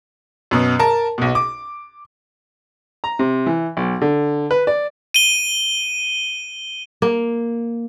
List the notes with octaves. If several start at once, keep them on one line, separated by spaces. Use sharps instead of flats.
F#2 B2
A#4 A5
B1 B2
D6
A#5
C3
E3
B1
D3
B4
D5
D#7 G7
A#3